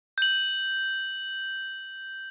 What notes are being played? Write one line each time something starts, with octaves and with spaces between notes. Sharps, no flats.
G6 F#7